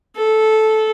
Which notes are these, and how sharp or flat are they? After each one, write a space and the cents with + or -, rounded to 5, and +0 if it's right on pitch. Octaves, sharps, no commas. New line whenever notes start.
A4 -10